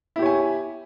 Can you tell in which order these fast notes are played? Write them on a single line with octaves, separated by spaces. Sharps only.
E4 G4 C#5 G#5